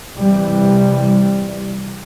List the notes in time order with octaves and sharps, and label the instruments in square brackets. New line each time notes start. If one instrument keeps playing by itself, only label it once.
[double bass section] C3 E3 G3